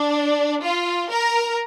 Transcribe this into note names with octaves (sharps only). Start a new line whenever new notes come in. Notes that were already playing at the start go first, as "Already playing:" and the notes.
Already playing: D4
F4
A#4